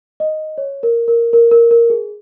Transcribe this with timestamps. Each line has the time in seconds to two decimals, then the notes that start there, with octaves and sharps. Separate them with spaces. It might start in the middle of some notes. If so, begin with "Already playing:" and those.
0.20 D#5
0.58 C#5
0.83 A#4
1.08 A#4
1.33 A#4
1.51 A#4
1.71 A#4
1.90 G#4